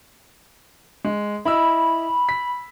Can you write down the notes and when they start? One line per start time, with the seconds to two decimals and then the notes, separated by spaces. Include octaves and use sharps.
1.05 G#3
1.45 E4 D#5 B5 E6
2.29 B6